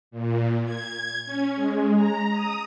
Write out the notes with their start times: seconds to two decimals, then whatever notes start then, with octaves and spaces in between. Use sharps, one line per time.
0.11 A#2
0.65 G#6
0.93 G#6
1.26 C#4
1.55 G#3
1.95 A#5
2.30 D#6